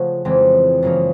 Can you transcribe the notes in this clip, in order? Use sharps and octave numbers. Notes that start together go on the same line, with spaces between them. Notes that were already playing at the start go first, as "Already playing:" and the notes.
Already playing: C#3 F3 A3 C#4 F#4
F2 C#3 E3 G#3 C4
F#2 C#3 F3 A#3 D#4